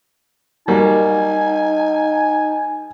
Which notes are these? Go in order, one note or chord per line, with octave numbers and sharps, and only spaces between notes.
G3 A#3 D#4 F#4 G#5